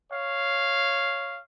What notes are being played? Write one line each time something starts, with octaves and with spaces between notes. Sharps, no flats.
C#5 F5